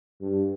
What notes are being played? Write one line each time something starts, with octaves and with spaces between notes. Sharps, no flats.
G2